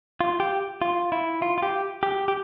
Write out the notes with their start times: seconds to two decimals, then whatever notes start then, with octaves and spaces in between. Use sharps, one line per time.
0.21 F4
0.40 G4
0.82 F4
1.12 E4
1.42 F4
1.58 F4
1.62 G4
2.03 G4
2.28 G4